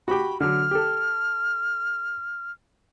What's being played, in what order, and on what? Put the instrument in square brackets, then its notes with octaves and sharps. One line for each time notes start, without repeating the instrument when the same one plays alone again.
[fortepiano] F#4 G4 [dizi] B5
[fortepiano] D3 F#3 [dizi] F6
[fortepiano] G4 A4